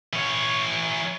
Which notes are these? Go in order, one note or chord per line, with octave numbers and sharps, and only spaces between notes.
E3 C#5